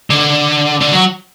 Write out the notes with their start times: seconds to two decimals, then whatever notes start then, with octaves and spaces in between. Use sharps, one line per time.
0.10 D3
0.81 D3
0.92 F#3